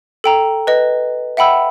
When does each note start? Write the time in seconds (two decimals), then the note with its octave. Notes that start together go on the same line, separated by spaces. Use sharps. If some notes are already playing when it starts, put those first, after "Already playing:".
0.24 A4 G5 A#5
0.67 B4 D#5
1.37 E5 F#5 G5 B5 E6